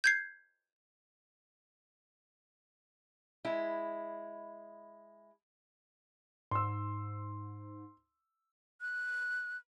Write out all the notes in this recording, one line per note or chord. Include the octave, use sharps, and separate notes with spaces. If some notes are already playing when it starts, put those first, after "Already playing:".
G6 G#6 C7
G#3 E4
G#2 C6 E6
F#6